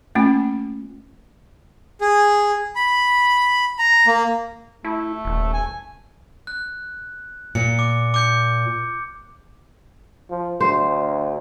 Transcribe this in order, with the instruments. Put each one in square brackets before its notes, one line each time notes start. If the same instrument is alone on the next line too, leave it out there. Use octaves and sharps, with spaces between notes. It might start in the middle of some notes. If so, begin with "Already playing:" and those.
[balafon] A3 A#3 C#4 F4
[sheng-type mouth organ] G#4
B5
A#5
A#3
[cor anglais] A3 [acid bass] E4
[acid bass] D#1
[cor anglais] G#5
[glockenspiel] F#6
[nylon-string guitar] A#2 [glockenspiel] C#7
[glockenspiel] D6
D6 G6 C#7
[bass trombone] F3
[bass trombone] D2 [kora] C5